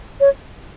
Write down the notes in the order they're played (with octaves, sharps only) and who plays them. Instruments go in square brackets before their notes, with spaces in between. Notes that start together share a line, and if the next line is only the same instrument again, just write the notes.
[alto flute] C#5